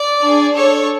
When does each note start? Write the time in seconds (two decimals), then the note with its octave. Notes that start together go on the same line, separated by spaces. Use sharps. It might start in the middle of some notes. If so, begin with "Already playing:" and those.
Already playing: D5
0.21 D4 G#4
0.53 D4 A4 C#5